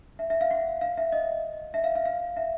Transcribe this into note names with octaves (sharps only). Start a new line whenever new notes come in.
E5
E5
F5
F#5
F5
E5
D#5
E5
F5
F5
F5
E5